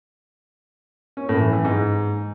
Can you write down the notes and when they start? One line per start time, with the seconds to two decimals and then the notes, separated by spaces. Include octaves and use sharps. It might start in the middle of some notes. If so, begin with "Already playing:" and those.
1.17 C#4
1.29 A2
1.41 E3
1.53 E3
1.65 G#2